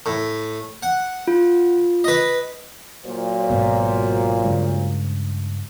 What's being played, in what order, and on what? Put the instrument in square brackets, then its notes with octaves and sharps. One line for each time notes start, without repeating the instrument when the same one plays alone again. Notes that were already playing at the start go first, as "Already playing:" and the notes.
[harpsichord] A2
F#5
[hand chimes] F4
[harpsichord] B4 D#5
[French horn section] A#2 F#3 C5
[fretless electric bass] G#1 G#2 B2
G2 C#3 G#3